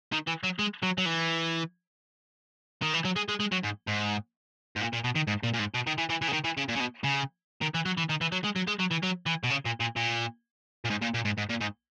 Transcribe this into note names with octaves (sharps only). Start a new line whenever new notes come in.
D#3
E3
F#3
G#3
F#3
F#3
E3
D#3
E3
F#3
G#3
G#3
G#3
F#3
G#2
G#2
G#2
A#2
A#2
B2
D#3
G#2
A#2
A#2
G#2
B2
D#3
E3
E3
E3
C#3
D#3
E3
C#3
A#2
C#3
B2
C#3
D#3
E3
F#3
E3
D#3
E3
F#3
G#3
F#3
G#3
F#3
E3
F#3
E3
B2
C#3
A#2
A#2
A#2
A#2
G#2
A#2
A#2
G#2
G#2
A#2
G#2